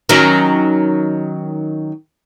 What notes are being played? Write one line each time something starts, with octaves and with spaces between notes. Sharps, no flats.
D#3 F#3 C#4